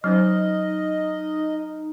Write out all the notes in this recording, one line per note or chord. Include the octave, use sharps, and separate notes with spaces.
F#3 C#4 D#4 C5 D#5 F6